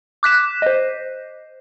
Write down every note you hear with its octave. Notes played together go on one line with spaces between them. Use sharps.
D6 F#6 B6 E7
C5 D#5